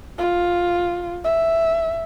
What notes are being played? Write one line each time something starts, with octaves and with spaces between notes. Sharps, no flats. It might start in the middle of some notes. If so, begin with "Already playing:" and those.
F4
E5